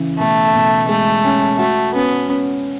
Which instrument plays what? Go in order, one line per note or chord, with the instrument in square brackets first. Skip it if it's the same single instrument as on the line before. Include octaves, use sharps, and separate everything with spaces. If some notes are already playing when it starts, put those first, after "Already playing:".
Already playing: [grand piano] C#3 E3
[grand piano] B2 [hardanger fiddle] A3
[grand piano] B2
[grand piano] G#3 [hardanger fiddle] A3
[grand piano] C#4
[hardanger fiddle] A3 [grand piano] F#4
[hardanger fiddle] B3 [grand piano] C#4
[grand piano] C#4